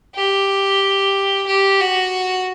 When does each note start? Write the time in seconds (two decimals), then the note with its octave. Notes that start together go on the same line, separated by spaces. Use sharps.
0.15 G4
1.47 G4
1.80 F#4